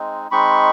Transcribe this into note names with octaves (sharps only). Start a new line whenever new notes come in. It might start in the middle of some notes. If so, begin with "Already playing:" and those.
Already playing: G#3 C4 D#4
G#3 C4 D#4 B5 C#6